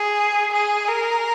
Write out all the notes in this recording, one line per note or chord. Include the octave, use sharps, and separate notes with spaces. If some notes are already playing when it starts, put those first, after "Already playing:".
Already playing: G#4
G#4
A#4